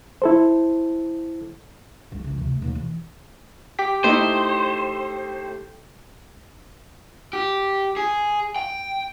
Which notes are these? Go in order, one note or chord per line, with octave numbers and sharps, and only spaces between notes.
E4 A4 C5
B1 G#3
C#3 E3
D1 C3
D#2 B2
E3
G4 G5 B6
A3 D#4 E4 C5
G4
G#4
G5